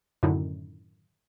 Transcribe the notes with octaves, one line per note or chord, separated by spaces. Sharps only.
F#2 A2 D3 D#3 D#4 E4